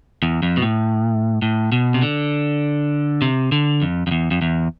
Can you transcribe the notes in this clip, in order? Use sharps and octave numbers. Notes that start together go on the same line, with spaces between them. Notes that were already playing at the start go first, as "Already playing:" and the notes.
E2
F2
B2
A2
A2
B2
C3
D3
C3
D3
F2
F2
E2
F2
E2